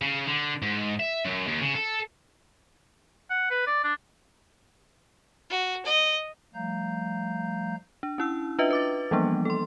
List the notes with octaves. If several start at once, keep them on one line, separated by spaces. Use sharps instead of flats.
C#3
D3
G#2
E5
F#2
D#2
C#3
A4
F#5
B4
D5
D4
F#4
D#5
F3 G3 A3 F5 A#5 G6
D4
C#4 E4 E6
D4 F4 B4 D#5 E5
B4 D6 A6
E3 F3 G3 A#3 B3 D4
A4 C6